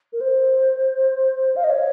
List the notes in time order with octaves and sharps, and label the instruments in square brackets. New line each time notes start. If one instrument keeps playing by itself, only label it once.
[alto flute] A#4
C5
F5
D#5
C#5